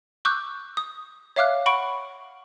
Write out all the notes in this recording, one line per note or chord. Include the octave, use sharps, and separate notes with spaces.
C#6 D6 E6 F#6 G6
D#6
C#5 E5 F5 D6 F6 F#6
F#5 B5 C#6 D7